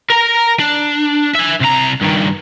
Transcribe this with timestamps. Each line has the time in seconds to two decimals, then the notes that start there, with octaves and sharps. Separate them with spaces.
0.10 A#4 A#5
0.59 D4
1.35 E5 G#5
1.61 C2 A#5
2.01 G2 D#3